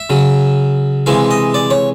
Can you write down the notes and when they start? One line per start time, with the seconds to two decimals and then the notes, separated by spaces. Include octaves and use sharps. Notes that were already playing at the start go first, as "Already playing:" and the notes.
Already playing: E5
0.10 C#3 F#3
1.06 C3 E3 G#3 F5
1.31 D#5
1.54 D5
1.70 C#5